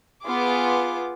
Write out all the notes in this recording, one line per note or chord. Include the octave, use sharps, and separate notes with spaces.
B3 F4 G#4 D6